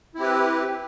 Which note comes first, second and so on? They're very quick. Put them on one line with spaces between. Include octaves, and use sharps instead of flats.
E4 C4 G4 B4